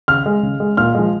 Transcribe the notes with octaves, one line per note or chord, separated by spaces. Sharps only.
C#3 F6
G#3
C#3
G#3
A#2 F6
F3 G#3